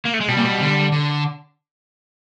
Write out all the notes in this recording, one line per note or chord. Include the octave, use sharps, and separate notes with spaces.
A#3
A3
G#3
B2 G3
A#2
B2
D3
D3